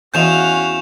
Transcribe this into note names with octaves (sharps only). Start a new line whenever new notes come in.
E2 C#4 F#4 F5 G#5 G6 E7 F7